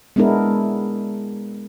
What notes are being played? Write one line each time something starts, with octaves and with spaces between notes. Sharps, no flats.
G#3 B3 D4 E4 A#4